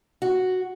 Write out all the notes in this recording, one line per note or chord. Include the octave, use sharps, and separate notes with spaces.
F#4